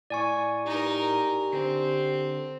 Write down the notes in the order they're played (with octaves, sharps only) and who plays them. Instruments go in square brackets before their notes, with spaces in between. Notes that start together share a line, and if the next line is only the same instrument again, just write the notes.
[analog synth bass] A2 [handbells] D5 G#5 C#6
[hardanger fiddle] D#4 A#4 [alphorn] G4
[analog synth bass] D3 [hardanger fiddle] C4